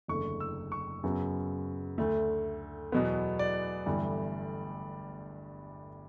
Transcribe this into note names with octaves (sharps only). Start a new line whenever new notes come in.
F#1 E2 D3 A3 C#6
E6
C#6
F#2 C#3 F#3 B3
D2 D3 A3
E2 B2 F#3 B3
D5
G1 G2 E3 A3